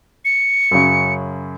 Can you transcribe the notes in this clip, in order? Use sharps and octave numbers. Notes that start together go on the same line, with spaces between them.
C#7
F#2 C#3